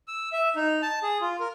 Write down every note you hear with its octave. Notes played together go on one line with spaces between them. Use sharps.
E6
E5
D#4
A5
G#4
F4
A#4